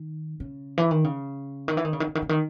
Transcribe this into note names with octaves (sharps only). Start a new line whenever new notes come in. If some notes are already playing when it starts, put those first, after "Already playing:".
Already playing: D#3
C#3
E3
D#3
C#3
D#3
E3
D#3
C#3
D#3
C#3
D#3
C#3
D#3